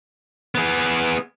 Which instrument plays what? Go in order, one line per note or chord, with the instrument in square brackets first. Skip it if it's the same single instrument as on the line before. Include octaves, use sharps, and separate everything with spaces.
[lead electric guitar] B3 G#4